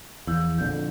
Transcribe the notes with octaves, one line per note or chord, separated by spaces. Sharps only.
E2 F3 E4 G6
A#1 F2 D3 G6